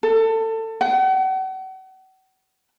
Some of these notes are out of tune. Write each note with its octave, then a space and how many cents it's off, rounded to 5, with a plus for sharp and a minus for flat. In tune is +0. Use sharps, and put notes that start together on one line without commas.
A4 +25
F#5 +40